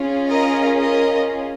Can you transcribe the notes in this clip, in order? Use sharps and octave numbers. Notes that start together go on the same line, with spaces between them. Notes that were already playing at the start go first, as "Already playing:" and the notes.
Already playing: C#4 F4 G#4
A#4 D#5
A#4 D#5